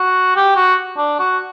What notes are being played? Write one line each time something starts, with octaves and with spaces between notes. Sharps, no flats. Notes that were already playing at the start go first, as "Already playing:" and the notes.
Already playing: F#4
G4
F#4
D4
F#4